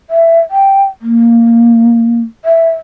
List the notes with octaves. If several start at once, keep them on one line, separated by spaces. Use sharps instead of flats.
E5
G5
A#3
E5